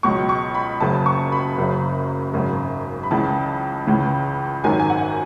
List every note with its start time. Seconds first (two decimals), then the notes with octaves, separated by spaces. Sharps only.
0.03 C#2 B2 F#3 C#6
0.29 C#6
0.54 B5
0.80 F#1 F#2 C#3 F#3 A5
1.06 C#6
1.32 B5
1.57 F#1 F#2 C#3
2.34 G#1 F#2 C#3
3.03 B5
3.11 C#2 C#3 E3 A5
3.87 C#2 C#3 E3
4.64 G#1 F#2 D#3 F#3 G#5
4.80 G#5
4.90 F#5